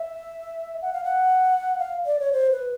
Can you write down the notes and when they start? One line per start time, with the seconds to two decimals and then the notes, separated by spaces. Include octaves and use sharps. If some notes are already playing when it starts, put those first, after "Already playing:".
Already playing: E5
0.82 F#5
0.93 F5
1.04 F#5
1.79 F5
2.06 D5
2.20 C#5
2.33 C5
2.51 B4